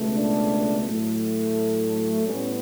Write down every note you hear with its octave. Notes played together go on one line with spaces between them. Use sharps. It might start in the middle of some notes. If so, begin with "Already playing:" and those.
Already playing: C#2 B2 A3
D4
A2 F#3 A3
A2 G3 B3 C#4